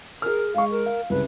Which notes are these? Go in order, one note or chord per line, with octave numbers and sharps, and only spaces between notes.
G#4 A#4 F6
G#3 F5 C#6
A#4
F5
C2 C#3 B4